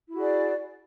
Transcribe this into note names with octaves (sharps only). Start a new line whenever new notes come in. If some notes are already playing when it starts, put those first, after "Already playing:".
E4 F#4 G#4 D5